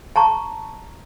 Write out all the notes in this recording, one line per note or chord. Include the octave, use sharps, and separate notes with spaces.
A5 A#5 C#6